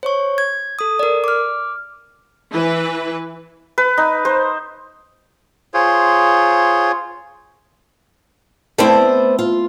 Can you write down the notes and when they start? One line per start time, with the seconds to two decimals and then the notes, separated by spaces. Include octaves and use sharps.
0.03 C5 C#5 C#6
0.38 G#6
0.79 A4 D#6
0.99 A#4 D5
1.24 D6 F6
2.53 E3 B4
3.78 B4
3.98 D#4
4.25 C5
5.74 F4 G#4 C5 C#5
8.78 A3 B3 C4 E4 C5 D5
9.39 F4